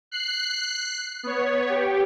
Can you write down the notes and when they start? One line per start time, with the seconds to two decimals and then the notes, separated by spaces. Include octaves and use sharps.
0.11 F#6 C7
1.23 B3 C#5
1.69 G4